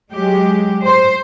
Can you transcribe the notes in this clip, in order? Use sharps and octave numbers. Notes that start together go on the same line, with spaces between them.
F#3 G#3 G4
C5